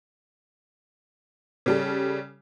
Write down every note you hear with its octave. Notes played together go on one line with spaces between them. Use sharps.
C#3 G3 A4